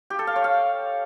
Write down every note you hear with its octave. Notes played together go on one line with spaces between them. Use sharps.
G4
A4
F5
C#5
F5